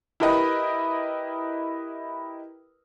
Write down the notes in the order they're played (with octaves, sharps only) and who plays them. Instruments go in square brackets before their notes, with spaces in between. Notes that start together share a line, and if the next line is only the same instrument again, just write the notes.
[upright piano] E4 G4 A#4 B4 D#5